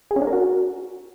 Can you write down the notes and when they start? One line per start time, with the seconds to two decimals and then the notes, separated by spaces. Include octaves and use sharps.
0.11 G#4
0.16 C#4
0.22 D4
0.27 A#4
0.33 F#4